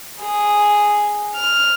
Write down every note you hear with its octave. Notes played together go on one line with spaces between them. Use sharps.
G#4
F6